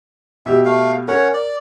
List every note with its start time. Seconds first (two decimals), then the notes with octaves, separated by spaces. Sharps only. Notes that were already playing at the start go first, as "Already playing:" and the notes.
0.46 B2 G4 E5
0.65 A3 F5
1.08 C#4 A#4 C#5 F#5
1.34 D5